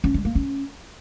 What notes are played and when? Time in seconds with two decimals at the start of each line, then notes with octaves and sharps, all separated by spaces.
0.04 C#4
0.14 G#3
0.25 A#3
0.35 C#4